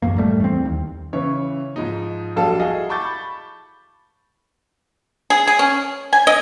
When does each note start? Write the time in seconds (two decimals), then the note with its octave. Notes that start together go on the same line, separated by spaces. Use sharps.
0.02 A1 F#2 A#3
0.18 A2 G3 A3
0.40 E2 C4
0.65 D#2
1.13 C#3 E3 C#5
1.76 G#2 F3 D#4
2.36 A#1 F#3 G3 A4 F5 A5
2.59 E4 F#4 G#4 D#5 F5
2.89 A5 B5 C#6 D6 G6 A6
5.30 G#4
5.47 G#4
5.59 C#4
6.13 G#5
6.27 D#5